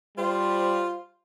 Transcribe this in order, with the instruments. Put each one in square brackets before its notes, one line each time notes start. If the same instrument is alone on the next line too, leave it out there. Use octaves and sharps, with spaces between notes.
[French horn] G3 [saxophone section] F4 C5